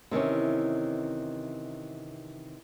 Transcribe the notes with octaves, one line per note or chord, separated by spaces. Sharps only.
C3 D#3 E3 C#4